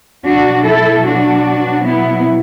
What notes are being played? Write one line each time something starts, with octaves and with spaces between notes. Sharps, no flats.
B2 F#3 D4 F#4
E4 A4
D4 F#4
B3 E4